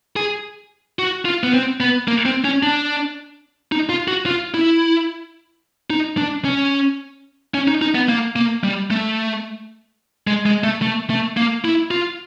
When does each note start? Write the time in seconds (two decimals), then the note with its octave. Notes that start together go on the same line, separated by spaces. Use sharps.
0.16 G#4
0.99 F#4
1.25 F4
1.43 B3
1.54 C4
1.80 B3
2.08 A#3
2.25 C4
2.44 C#4
2.63 D4
3.72 D#4
3.89 F4
4.08 F#4
4.26 F4
4.54 E4
5.90 D#4
6.17 D4
6.45 C#4
7.54 C#4
7.68 D#4
7.82 D#4
7.95 B3
8.09 A#3
8.36 A#3
8.64 G3
8.91 A3
10.27 G#3
10.46 G#3
10.64 A3
10.82 A3
11.10 A3
11.37 A#3
11.65 E4
11.91 F4